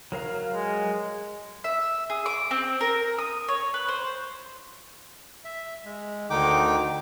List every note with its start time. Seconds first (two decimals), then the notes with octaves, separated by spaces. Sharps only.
0.12 F#3 A#4 F5
0.53 G#3
1.64 E5
2.10 G#4
2.26 D6
2.51 C4
2.81 A#4
3.19 D#6
3.48 C#5
3.74 B4
3.89 C5
5.45 E5
5.85 G#3
6.30 D2 D3 D#3 D#4 G5 D6